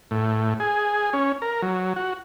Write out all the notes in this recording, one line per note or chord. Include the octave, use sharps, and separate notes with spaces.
A2
G#4
C#4
A#4
F#3
F#4